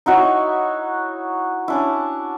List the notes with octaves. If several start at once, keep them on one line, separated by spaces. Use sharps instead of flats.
D#4 E4 F#4 C#5
C#4 D4 E4